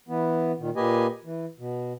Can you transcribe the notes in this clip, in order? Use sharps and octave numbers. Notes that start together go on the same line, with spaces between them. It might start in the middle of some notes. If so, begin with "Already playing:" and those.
E3 B3
A#2 D#3
A#2 A#3 G4 B4 D#5 G#5
E3
B2